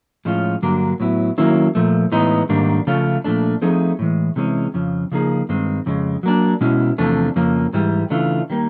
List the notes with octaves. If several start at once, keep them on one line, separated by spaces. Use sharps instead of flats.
A2 F3 G#3 C#4 F4
G2 D3 F#3 A#3 D4
A2 F#3 B3 E4
D#3 F#3 A#3 C#4 E4
A#2 F3 A3
A2 E3 G#3 B3 D#4
G#2 D#3 G3 A#3 D4
C#3 F3 A3 C#4 F4
A#2 F3 A3 D4
F3 A3 C4 D#4 G#4
A2 E3 G#3
C3 E3 G#3 C#4
F2 C#3 F3
C#3 F3 A#3 D#4 G#4
G2 D#3 G#3 C4
F2 C#3 G#3
F#3 A#3 D4
B2 G#3 C#4 E4
E2 C3 F3 A3 D4
F2 C#3 F3 A#3
G#2 E3 G3
C#3 E3 A3 D4 F4
D#3 G3 A#3